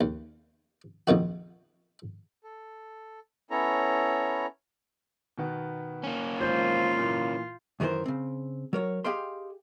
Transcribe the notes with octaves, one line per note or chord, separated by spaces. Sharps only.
D#2
A#1 F2 D#3 F#4
A4
B3 C#4 E4 A4 C#5 A#5
B2 D#3 B3
A#3 C#4
G#1 F4 C5 G6
A#2 E3
F#2 D#3 E3 G#4 A#4 C5
C#3 C4
F#3 A#4 C#5
G4 G#4 D#5 F5 G5 C6